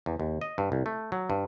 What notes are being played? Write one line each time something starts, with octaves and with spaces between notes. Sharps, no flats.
E2
D#2
D#5
G2
C2
A3
F#3
G2